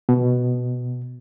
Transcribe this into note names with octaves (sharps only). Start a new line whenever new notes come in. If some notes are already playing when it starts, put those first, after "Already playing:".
B2